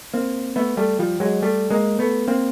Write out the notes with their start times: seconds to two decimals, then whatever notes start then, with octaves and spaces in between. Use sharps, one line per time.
0.14 A#3 C4
0.56 A3 B3
0.77 G3 A3
0.99 F3 G3
1.20 F#3 G#3
1.42 G3 A3
1.70 G#3 A#3
1.99 A3 B3
2.28 A#3 C4